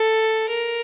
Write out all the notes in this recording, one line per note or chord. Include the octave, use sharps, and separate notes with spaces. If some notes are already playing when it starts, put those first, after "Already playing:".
Already playing: A4
A#4